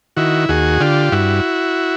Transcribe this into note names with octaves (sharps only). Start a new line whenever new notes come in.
D#3 E4 F#4
D#2 F#4 G#4
D3 F4 G4
G2 E4 F#4